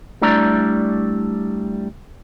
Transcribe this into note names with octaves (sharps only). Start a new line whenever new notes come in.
G3 A3 D4 E4 D5 A#5